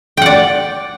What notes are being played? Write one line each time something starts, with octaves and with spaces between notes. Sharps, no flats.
D5 F#5 G5